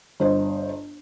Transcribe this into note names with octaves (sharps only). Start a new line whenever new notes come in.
G1 C5 D#5